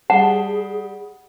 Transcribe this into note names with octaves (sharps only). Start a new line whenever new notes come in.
G3 G#4 F#5 A5